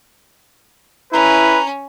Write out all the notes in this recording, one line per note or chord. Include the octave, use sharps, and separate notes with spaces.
C#4 E4 B4 A#5